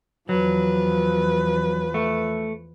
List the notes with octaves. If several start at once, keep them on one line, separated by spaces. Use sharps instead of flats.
E2 F3 F#3 B4
A3